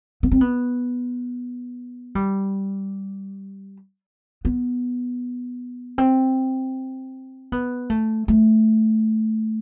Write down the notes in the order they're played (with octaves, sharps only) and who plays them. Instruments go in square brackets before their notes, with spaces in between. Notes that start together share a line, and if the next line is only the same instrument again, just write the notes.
[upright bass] B3
C4
B3
G3
B3
C4
B3
A3
A3